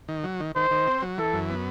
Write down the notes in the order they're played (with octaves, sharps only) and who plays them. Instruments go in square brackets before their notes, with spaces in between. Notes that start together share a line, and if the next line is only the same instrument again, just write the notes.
[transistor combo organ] D#3
F#3
D#3
[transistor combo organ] D#3 [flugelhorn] C5
[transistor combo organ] D#3
C4
F#3
[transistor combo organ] E3 [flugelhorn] A4
[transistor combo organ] F#2
B3